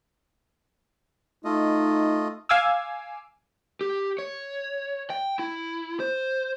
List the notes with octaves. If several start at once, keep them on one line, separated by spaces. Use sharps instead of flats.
A3 D#4 F4 D#5
F5 G#5 D6 E6
G4
C#5
G5
E4
C5